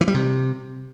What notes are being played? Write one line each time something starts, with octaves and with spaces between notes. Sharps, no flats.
E3
G3
C3